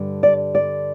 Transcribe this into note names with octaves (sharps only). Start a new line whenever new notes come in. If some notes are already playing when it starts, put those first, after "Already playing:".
Already playing: G2 D3 G3
D5
D5